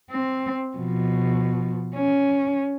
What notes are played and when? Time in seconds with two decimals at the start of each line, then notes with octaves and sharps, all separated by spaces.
0.11 C4
0.77 B2 F3
1.96 C#4